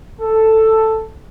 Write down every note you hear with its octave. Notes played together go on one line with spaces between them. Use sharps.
A4